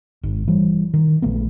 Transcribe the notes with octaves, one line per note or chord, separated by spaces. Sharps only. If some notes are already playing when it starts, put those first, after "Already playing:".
G#1 G#2
E3 G3
D#3
A#1 A3 B3